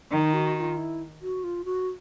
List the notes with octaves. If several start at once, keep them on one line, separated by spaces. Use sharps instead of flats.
D#3 D#4
F#4
F#4
F4
E4
F#4
F4
F#4